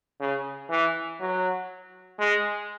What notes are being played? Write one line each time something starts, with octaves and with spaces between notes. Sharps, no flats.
C#3
E3
F#3
G#3